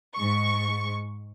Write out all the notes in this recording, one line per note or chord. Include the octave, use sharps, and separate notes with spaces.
G#2 C#6